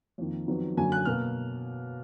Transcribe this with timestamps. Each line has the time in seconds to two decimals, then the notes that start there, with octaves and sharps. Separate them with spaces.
0.18 F2 D#3 A#3
0.48 F2 D#3 F#3 B3
0.76 F#2 D3 F#3 A#3 G#5
0.92 F#6
1.05 B2 A#3 F6